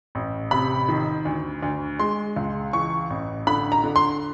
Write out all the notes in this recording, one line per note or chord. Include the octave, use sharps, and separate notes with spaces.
A1
C3 B5
D#3
D2
D2
G#3 C6
C#2
E3 C#6
A1
D3 B5
A#5
D3
C6